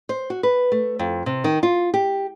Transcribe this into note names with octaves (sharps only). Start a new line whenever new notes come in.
C5
F#4
B4
A3
F2
C3
D#3
F4
G4